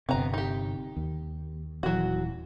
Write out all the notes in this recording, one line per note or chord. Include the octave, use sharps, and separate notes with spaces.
G1 C3 B3 A#5
D#4 G4
D#2
D#1 E3 F#3 F#4